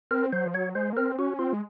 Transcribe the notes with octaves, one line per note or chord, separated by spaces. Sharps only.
C4 A#4
F#3 C5
F3
F#3 C#5
G#3 C5
A#3
C4 A#4
C#4 F#4
C4 F4
G#3